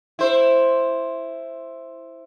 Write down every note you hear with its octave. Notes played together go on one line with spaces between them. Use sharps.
E4 C5